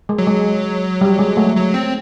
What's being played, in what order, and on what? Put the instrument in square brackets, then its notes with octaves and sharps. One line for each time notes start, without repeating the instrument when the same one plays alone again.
[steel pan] G#3
[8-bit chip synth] F#3
[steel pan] G#3
G3
G#3
A3
[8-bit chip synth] F#3
C4